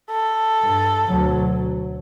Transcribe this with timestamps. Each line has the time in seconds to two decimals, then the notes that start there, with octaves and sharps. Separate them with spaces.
0.11 A4
0.67 G2
1.08 D2 B2 F#3